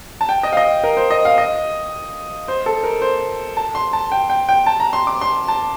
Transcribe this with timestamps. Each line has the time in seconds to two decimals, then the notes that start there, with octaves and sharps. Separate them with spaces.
0.21 A5
0.29 G5
0.43 D#5
0.53 F5
0.57 D#5
0.84 A#4
0.97 C5
1.11 D#5
1.25 F5
1.38 D#5
2.48 C5
2.66 A4
2.83 A#4
3.02 C5
3.57 A5
3.75 C6
3.93 A5
4.12 G5
4.30 G5
4.49 G5
4.67 A5
4.80 A#5
4.93 C6
5.07 D6
5.21 C6
5.48 A5